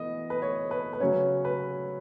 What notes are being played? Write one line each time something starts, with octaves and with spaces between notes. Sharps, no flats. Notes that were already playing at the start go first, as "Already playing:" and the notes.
Already playing: E3 B3 D#5
B4
C#5
B4
B4
C#3 F#3 C#4 C#5
B4